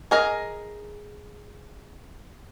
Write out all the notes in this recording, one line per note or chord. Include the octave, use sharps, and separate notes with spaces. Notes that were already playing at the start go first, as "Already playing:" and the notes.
G#4 A#4 D#5